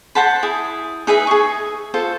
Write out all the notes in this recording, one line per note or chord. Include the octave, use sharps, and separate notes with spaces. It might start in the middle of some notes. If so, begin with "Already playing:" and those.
C5 F#5 A5 B5
E4 G#4
D#4 G#4 B4 E5
G#4 C#6
F4 A4 C5